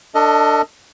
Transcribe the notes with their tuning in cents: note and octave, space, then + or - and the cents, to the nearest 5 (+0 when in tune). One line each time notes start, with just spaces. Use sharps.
D4 +0 A4 +35 D#5 +15